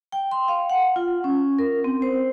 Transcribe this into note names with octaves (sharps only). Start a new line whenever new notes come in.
G5
C6
F5
F#5
F4
C#4
A#4
C4
C5